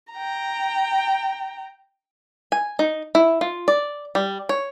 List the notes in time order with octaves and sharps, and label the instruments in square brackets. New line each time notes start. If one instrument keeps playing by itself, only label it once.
[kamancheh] G5 A#5
[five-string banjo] G#5
D#4
E4
F4
D5
G3
C#5